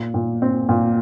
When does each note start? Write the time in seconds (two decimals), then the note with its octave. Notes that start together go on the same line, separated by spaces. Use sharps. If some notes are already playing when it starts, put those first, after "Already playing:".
Already playing: A#2
0.14 A#2
0.42 C4
0.69 A#2